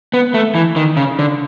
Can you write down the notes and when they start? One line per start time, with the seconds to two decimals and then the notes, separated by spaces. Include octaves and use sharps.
0.14 B3
0.34 A3
0.55 E3
0.76 D#3
0.97 C#3
1.19 D3